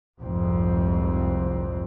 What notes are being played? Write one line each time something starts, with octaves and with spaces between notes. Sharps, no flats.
F1 C2 F2 G#2 C4